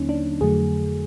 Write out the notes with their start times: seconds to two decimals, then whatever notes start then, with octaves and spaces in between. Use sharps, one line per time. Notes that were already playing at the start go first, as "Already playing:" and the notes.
Already playing: D#2 D3 F#3 A#3 C#4 D#4
0.09 D4
0.41 F2 D3 F#3 A3 G#4